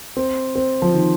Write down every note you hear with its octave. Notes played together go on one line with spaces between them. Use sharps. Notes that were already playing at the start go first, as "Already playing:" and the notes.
C4
C4
F3
D#3